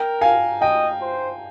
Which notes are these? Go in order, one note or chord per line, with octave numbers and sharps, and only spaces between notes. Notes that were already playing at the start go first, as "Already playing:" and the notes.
Already playing: A#4 G5 A#5
F5 G#5
D#5 G5
C5